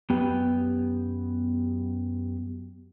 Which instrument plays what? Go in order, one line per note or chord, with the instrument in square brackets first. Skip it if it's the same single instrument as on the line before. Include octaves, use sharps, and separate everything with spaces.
[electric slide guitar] F#2 B3 G4 G5